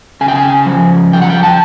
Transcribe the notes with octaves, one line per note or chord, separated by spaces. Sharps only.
C#3 G#5
G5
G#5
F3
F3 G5
F#5
G5
A5